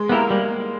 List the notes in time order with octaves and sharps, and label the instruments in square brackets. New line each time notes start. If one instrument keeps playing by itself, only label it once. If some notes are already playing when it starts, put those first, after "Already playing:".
Already playing: [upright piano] G#3
[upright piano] A#3 [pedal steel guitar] B3 E4 G4 A#4
[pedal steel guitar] G3 [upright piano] A#3